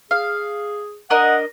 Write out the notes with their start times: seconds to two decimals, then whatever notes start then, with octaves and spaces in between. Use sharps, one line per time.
0.11 G#4 F5
1.10 D4 A#4 D#5 F#5